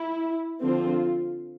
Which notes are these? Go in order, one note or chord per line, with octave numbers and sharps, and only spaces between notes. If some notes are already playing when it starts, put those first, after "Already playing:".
Already playing: E4
D3 F3 C4 F4